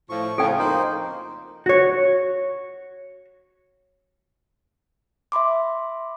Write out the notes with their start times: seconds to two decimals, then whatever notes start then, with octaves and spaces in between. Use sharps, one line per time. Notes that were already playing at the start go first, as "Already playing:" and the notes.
0.09 A2 F3 C#6
0.38 A2 C#3 F3 A4 G5
0.59 F2 A#3 D#4 C5
1.66 F#4 C#5
5.32 E5 B5 C6 D6